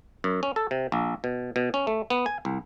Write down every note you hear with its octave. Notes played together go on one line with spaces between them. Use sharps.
F#2
C#4
A4
C3
A#1
B2
B2
C#4
A3
B3
G#5
C2